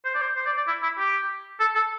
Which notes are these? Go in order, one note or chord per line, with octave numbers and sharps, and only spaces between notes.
C5
D5
C5
C5
D5
D5
E4
E4
G4
A4
A4